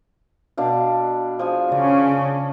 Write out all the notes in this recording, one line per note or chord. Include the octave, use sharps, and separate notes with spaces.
B2 D4 F5
F3 G#4 G#5
C#3 C#4 D5